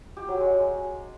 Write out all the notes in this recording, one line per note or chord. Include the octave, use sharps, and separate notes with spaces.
G4
F#3
G#3